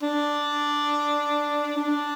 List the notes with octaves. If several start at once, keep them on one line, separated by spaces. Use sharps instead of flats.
D4
D4